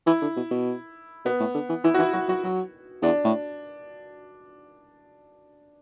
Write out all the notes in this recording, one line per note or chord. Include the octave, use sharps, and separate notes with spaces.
E3 E4
D3
B2
B2
B2 B3
A2
D3
E3
E3 E4
F#4
E3 E4
F#3 F#4
F#3 F#4
F#3
E2 D4
A2